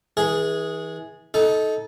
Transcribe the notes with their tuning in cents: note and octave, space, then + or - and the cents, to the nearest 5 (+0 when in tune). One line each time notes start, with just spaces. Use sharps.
E3 -35 G#4 +0
D#4 +15 A4 -15